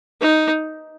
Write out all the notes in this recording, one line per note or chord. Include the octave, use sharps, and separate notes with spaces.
D#4